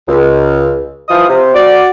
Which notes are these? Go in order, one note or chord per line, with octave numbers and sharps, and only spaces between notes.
C#2
E3 F3 F5 D#6
C3
F#4 D5